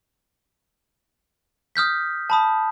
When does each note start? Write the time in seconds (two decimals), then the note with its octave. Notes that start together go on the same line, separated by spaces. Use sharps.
1.76 D#6 F6 G6 B6
2.30 A5 B5 D#6